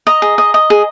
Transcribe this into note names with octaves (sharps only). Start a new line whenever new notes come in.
D#5 A#5
G#4
D#5
D#5
G#4